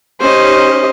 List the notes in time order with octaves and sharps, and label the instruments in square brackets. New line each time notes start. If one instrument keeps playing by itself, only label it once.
[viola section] C#4 D#4 G4 [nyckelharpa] C5 D#5